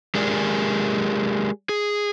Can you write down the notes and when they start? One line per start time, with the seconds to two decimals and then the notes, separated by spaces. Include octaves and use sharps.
0.15 G#3 G4 G#4 A#4 D5
1.69 G#4